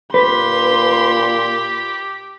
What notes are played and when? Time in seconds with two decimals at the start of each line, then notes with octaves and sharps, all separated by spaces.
0.14 A#2 G4 B4 C6